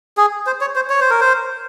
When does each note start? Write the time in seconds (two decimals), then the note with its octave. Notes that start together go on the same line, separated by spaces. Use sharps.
0.17 G#4
0.47 C5
0.61 C#5
0.76 C5
0.90 C#5
1.00 C5
1.10 A#4
1.21 C5